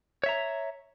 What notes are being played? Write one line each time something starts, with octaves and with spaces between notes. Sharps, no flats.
C#5 E5 A#5